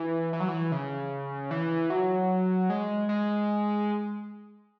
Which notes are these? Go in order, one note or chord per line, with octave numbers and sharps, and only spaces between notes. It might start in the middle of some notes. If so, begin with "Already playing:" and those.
Already playing: E3
E3
F#3
E3
C#3
E3
F#3
G#3
G#3